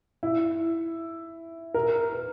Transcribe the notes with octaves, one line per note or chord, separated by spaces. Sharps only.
E4
A#4
B4